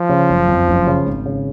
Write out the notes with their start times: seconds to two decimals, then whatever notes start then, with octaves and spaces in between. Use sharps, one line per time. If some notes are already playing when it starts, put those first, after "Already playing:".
Already playing: F3
0.09 C#3
0.29 F#1
0.48 F2
0.68 F#1
0.87 C#3
1.06 G#1
1.26 C#3